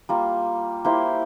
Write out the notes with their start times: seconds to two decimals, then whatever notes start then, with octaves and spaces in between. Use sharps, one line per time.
0.09 G3 A#3 F4
0.85 A#3 E4 G4 C5